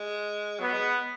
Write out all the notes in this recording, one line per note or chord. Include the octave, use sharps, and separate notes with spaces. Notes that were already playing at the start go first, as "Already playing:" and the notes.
Already playing: G#3
F#3 B3
G#3